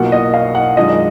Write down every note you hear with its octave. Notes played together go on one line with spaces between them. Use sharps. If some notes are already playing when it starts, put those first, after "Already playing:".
Already playing: B1 B2 A#3 F4 F#5
D#5
F5
F#5
F#2 D#3 G#3 D4 F4 D#5